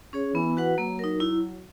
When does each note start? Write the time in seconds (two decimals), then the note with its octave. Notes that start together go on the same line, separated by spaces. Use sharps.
0.13 C#4 G#4 C#5
0.34 E3 B3
0.57 F#4 B4 F#5
0.78 F#3 A#3
0.99 D#4 A#4
1.20 E4